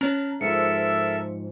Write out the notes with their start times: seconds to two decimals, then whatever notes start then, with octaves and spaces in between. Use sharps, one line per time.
0.01 C#4 C#5 A5 A#5 F6
0.41 G#2 F3 A4 A#4 E5 C#7